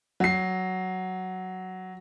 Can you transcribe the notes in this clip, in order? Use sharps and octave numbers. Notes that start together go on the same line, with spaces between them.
F#3 C7